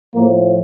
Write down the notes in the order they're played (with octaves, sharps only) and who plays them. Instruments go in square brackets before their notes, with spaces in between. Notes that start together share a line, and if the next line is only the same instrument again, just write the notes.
[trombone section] A2 F3 A#3